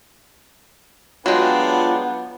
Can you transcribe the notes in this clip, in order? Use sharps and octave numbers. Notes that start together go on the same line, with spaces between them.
F#3 G#3 B3 D4 F4 F5 G5